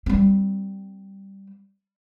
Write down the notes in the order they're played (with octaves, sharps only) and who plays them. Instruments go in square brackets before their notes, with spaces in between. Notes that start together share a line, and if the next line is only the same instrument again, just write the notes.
[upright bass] G3 C4